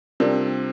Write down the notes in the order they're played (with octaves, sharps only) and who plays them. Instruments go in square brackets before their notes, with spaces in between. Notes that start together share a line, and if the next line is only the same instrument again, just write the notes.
[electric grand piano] C3 C4 [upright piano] G3 D4 F4 A#4 D5